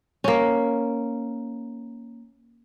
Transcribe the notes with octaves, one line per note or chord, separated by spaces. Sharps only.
A#3 C#4